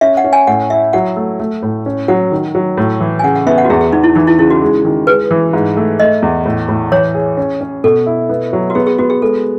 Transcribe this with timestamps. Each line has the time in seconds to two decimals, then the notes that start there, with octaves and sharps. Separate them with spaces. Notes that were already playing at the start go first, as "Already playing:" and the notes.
0.01 C#4 E5
0.17 F#5
0.24 C#4
0.33 G#5
0.47 A2 F#5
0.70 E4 E5
0.93 F#3 F#5
1.16 A3
1.40 A3
1.63 A2
1.86 C#4
2.08 F#3 F#5
2.32 D#3
2.55 F#3
2.78 A2
3.00 E3
3.19 G#5
3.24 C#3 F#5
3.35 F#5
3.47 B3 E5
3.58 F#5
3.65 F#4
3.70 E2 G#4
3.81 G#4
3.92 E2 D#4
4.04 E4
4.15 E3 D#4
4.27 E4
4.39 C#3 E4
4.50 F#4
4.62 G#3
4.85 D#3
5.07 G#3 B4
5.31 E3
5.53 G#2
5.77 A3
6.00 A3 D#5
6.22 E2
6.46 A2
6.69 A2
6.91 E3 C#5
7.15 G#4
7.37 C#4
7.61 C#4
7.84 B2 A4
8.06 E4
8.29 B3
8.53 F#3
8.70 F#4
8.75 B3 G#4
8.87 G#4
8.98 B3 F#4
9.10 G#4
9.22 G#3 A4